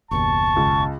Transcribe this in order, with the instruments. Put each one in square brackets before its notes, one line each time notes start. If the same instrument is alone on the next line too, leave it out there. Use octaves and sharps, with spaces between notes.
[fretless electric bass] F#1 D#2 B2 [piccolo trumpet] A5 [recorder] C#6
[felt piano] C#2